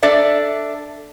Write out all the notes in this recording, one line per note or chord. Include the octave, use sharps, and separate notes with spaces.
D4 A4 D5 E5